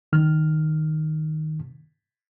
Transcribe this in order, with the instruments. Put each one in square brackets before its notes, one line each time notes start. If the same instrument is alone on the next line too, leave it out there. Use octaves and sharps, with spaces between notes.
[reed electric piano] C#2 D#3 F6